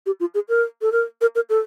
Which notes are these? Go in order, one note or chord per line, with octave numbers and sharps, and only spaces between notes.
G4
F4
G#4
A#4
A4
A#4
A#4
A#4
A4